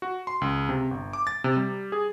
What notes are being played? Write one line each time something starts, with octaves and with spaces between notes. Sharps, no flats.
F#4
C6
C#2
C3
G1
D6
A6
C3
G3
G#4